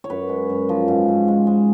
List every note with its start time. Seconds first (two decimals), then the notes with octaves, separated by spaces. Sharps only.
0.04 C#5
0.10 F#2 B4
0.29 G#3
0.50 F#2
0.69 F3
0.88 G#2
1.08 G#2
1.28 G#3
1.47 G#3